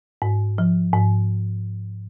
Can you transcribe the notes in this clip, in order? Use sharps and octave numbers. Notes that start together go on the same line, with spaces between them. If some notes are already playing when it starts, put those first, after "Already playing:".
G#2
F3
G#2